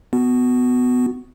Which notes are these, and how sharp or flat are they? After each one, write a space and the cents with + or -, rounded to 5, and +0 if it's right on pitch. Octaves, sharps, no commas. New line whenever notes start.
B3 +15 F#4 +0